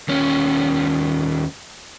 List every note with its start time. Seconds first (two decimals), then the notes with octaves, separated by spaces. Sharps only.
0.09 D#2 C#4